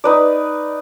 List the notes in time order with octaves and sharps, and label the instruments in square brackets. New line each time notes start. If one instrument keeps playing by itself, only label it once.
[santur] D#4 B4 D5